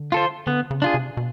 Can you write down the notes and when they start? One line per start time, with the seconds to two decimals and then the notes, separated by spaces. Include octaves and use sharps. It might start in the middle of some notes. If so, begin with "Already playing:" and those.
Already playing: D3
0.12 F4 A4 C5
0.47 D3 B3
0.71 C#3
0.82 D4 F4 G#4
0.94 C3
1.17 B2